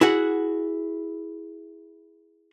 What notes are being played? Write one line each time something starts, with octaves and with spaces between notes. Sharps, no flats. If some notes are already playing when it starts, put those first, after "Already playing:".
E4 F#4 G#4 F#5